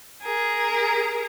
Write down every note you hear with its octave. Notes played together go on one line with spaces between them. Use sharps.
G#4 A#4